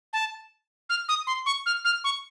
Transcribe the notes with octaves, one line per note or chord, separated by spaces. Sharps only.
A5
F6
D#6
C6
C#6
F6
F6
C#6